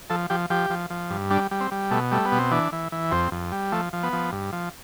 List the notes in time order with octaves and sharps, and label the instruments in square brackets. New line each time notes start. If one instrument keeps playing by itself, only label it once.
[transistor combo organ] F3 A4
F3 G4
F3 G4
F3
F3
G2
G3 D4
G3
C4
G3
B2 A3
G3 A3
B3
B2
C4
E3 D4
E3
E3
F2 C4
F2
G3
F3 A3
F3
B3
F3
G2
F3